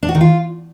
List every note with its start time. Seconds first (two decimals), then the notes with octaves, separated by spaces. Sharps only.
0.03 D4
0.09 F#4
0.15 D#3
0.21 F4